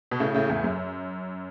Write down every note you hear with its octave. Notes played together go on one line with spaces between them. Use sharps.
B2
A2 C#3
A2 C#3
E2 A2
F#2